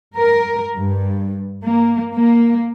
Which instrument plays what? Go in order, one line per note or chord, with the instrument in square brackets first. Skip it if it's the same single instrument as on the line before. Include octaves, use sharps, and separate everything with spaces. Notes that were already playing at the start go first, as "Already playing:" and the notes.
[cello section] A#4
G2
A#3
A#3